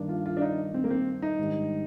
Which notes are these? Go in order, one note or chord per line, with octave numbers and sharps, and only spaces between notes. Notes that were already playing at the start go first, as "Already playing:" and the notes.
Already playing: G2 D#3 A#3 D4
F4
F4
D4
D#4
C4
A#3
C4
D#4
G#2 D#3 G3 D4